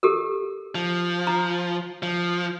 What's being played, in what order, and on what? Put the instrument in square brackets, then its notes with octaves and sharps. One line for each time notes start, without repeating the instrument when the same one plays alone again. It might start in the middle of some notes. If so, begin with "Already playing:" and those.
[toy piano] G4 A4 A#4
[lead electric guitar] F3
[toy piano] A#5
[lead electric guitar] F3